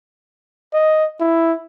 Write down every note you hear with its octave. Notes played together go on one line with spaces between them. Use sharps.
D#5
E4